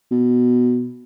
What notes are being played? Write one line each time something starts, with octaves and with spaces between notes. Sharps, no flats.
B2